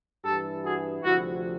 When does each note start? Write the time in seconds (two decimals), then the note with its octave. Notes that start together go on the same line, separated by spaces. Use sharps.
0.24 G2 E3 G4 A4
0.64 F#4 G#4
1.04 D2 C3 F3 E4 F#4